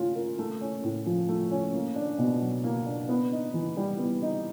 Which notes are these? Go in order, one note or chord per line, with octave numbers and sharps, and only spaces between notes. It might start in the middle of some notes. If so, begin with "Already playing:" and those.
Already playing: A3 C#4 F4
A#4
A3
C#4
A2
F3
A3
C#4
A#3
D4
B2
F#3
A#3
D4
B3
D#4
E3
G3
B3
D#4